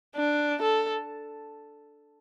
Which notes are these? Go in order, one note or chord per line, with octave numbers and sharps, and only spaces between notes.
D4
A4